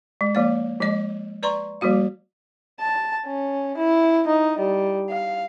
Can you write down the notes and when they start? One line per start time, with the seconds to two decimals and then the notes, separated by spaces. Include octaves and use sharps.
0.21 G#3
0.35 F3 A#3 D5
0.80 F3 G#3 D#5
1.43 B4 D5 A#5 C6 C#6
1.81 F3 G3 A#3 F#4 F5
2.80 A5
3.26 C#4
3.78 E4
4.27 D#4
4.59 G3
5.10 F5